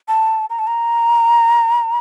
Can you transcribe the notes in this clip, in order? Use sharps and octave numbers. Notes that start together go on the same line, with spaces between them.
A5
A#5
A5
A#5